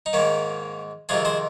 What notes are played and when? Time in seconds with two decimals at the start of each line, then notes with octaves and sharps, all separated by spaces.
0.06 D#4
0.13 G#2 D#3 A#3 C#4
1.09 F2 C3 D#3 F4 G#4
1.25 G#4 C5